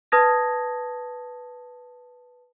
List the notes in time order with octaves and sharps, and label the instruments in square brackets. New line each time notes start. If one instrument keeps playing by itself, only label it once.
[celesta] B4 A5 D#6 G#6 A#6